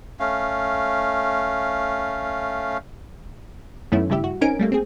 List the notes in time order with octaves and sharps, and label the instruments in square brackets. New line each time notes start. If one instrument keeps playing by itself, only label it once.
[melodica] A3 C#4 F5
[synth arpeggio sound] F#2 D#3 A3 B3 C#4 E4
G2 C#3 G3 E4 G4 E5
F#4
C4 C#4 D#4 A#4 G#5 D7
G3 A3 A#3
C4 G#4